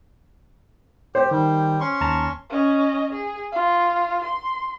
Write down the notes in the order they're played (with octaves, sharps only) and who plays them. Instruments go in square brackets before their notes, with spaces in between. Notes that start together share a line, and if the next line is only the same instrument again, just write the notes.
[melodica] G4 [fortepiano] C5
[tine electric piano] D#3 [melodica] G3
[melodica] C#4 C6 C#6
[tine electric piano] D#2 A5 A#5
[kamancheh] C#4 D#5
G#4
F4
C6